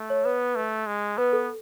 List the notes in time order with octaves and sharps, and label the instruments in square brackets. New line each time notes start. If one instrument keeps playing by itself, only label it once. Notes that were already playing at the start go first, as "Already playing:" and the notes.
Already playing: [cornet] A3
[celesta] C#5
[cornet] B3 [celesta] B4
[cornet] A3
G#3
[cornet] B3 [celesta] B4
[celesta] A4